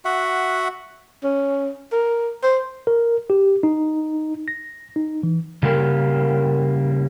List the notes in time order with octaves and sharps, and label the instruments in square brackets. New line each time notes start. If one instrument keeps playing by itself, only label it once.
[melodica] F#4 E5 F#5
[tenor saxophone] C#4
A#4
C5
[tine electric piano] A#4
G4
D#4
A#6
D#4
E3
[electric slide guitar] C#3 G3 A#3 A#4